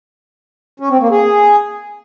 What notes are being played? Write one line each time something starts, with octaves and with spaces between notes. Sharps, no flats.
C#4
C4
A#3
G#4